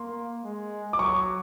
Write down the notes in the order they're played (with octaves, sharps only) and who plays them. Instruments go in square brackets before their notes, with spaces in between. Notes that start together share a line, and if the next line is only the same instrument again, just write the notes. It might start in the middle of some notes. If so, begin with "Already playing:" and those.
Already playing: [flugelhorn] A#3 [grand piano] C6
[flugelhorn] G#3
[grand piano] D6
[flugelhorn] F#3 [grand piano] C#6